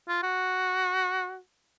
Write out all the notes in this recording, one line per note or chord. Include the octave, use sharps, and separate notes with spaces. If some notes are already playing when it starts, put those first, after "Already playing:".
F4
F#4